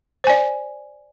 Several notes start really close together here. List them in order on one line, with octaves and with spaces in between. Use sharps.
C5 G#5 D5